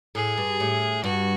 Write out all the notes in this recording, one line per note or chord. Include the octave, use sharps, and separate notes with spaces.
A2 G#4
G2
A2
G2 F#4